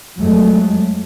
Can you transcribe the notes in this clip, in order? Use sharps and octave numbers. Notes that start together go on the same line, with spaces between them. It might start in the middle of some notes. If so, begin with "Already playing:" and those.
F2 F#3 G#3 A3